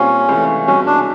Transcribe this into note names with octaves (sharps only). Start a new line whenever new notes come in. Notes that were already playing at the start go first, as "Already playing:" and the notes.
Already playing: A#2 G3 C4 C#4 F4
C#2 C3 E3 A3
C2 B2 G#3 C#4
D4